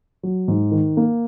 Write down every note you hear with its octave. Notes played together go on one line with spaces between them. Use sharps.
F#3
G#2
D#3
A#3